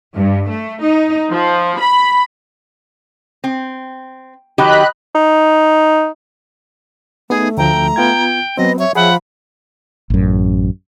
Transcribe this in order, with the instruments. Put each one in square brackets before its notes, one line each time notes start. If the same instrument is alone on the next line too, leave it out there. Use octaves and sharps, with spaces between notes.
[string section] G2
A3
D#4
F3
B5
[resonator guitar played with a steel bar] C4
[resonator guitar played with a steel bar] D#3 F#3 G4 [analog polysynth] D#5 B5 F#6
[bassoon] D#4
[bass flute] A3 [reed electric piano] B3 D#4 [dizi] G#4
[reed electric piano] D2 F3 [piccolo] G5 [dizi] A#5
[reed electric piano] B3 F4 G#6 [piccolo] G5
[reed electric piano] F#3 C4 [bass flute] B3 [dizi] D#5
[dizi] C#5 [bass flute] E5
[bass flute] F3 [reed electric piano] G#4 C#5 E5 [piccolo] F#5 [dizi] B5
[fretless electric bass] A1 F#2